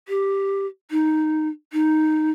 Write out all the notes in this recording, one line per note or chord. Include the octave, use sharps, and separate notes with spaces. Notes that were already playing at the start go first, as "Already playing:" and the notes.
G4
D#4
D#4